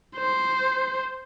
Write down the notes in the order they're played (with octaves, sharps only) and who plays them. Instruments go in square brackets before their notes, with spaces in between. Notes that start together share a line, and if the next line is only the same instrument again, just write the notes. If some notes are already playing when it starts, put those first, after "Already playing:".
[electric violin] C5